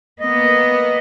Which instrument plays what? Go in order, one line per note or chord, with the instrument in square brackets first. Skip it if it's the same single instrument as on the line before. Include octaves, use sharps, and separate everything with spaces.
[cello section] A#3 B3 [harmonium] D#5